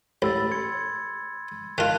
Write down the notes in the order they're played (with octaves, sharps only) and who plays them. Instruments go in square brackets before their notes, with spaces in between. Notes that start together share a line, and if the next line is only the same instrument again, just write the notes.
[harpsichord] A1 [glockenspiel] B5 E6 A6
[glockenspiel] C6 G#6 C#7
[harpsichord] D#3 F4 [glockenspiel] A5 F#6 F7